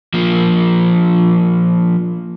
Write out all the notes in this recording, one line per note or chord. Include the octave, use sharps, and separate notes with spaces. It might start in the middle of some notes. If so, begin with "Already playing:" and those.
F3 A#3